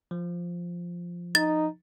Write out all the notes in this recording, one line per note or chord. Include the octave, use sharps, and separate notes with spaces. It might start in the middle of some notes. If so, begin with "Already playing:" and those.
F3
D#4 A6